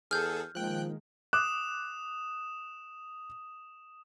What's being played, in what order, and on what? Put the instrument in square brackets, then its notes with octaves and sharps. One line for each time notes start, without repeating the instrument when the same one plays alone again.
[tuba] E2 [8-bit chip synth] G#4 A4 [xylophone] F6 G6
[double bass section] D#3 G#3 A#3 [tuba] F3 [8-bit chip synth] G5 F#6
[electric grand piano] D6 F#6 [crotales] D#6 E7